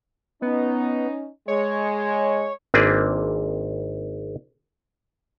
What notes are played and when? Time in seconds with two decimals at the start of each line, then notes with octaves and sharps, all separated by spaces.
0.42 B3 C#4 D#4
1.48 G#3 C#5
2.74 G#1 A#3 C4 D4 G#4 B4